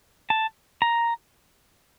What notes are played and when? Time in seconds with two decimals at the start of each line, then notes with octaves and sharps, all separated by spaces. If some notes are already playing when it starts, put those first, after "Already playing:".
0.30 A5
0.82 A#5